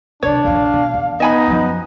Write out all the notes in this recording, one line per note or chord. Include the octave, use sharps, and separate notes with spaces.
B1 C3 D4 C#5 D5
A#1 F2 F5
B2
E2
B3 D#4 D#5 G#5 B5
F#2 F3